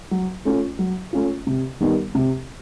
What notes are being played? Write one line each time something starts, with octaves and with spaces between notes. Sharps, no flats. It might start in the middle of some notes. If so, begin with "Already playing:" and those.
F#3
A3 C#4 F4
F#3
A3 C#4 F4
C3
D#3 G3 B3 D#4
C3